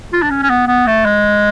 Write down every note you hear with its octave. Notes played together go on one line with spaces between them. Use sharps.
F4
D4
C#4
C#4
B3
B3
A3
G#3